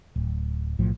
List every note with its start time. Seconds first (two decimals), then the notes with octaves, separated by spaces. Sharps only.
0.16 D1
0.79 B1 A2 F3